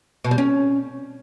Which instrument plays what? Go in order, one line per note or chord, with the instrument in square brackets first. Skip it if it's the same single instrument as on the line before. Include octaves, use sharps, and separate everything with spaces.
[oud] B2
G3
C#4